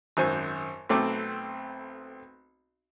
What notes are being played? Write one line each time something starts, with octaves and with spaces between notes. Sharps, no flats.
G#1 F#2 C5 G#5
B1 A3 C4 D6